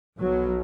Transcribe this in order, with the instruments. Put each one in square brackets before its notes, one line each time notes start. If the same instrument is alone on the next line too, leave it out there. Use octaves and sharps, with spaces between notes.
[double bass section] B1 B2 F#3